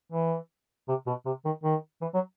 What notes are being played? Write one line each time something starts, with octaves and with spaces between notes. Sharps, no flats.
E3
C3
B2
C3
D#3
D#3
E3
F#3